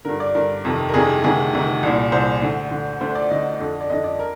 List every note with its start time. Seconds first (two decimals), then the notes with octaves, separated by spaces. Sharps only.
0.05 G2 D3 A#4
0.20 D5
0.35 G2 D3 A#4
0.65 F2 C3 D#3
0.89 A#4
0.94 F2 C3 D#3 G#4
1.24 D2 C3 D#3 G#4
1.53 D2 C3 D#3
1.83 C2 A#2
2.12 C2 A#2 C5
2.42 D2 D3
2.71 D2 D3
3.01 D2 D3 C5
3.15 D5
3.30 D2 D3 D#5
3.60 F2 D3
3.81 D5
3.90 F2 D3 D#5
4.04 D5
4.19 A#4